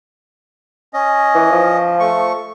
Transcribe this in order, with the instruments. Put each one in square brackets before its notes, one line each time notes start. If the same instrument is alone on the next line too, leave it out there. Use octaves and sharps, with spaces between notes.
[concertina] C#4 D#5
[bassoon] E3
F3
[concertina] A3 C#6